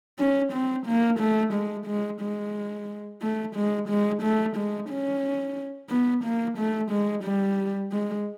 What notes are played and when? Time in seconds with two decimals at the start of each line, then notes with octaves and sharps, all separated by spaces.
0.19 C#4
0.53 C4
0.87 A#3
1.20 A3
1.53 G#3
1.86 G#3
2.21 G#3
3.22 A3
3.56 G#3
3.89 G#3
4.22 A3
4.56 G#3
4.89 C#4
5.90 B3
6.24 A#3
6.57 A3
6.91 G#3
7.24 G3
7.92 G#3